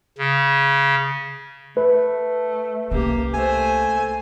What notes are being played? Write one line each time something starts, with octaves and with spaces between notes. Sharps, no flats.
C#3
A3 B4
C2 A#3 C#4 G4
A3 C5 G#5